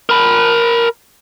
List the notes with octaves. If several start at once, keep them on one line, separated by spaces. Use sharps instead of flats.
A#4 B5